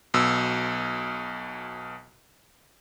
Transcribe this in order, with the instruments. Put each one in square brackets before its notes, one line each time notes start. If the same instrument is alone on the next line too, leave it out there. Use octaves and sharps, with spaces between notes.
[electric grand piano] B1 B2 E6